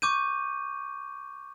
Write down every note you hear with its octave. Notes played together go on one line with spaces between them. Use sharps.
C#6 D6 G6 D#7